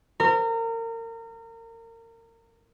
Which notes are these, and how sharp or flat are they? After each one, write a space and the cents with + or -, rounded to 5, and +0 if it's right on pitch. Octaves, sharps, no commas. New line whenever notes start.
A#4 -30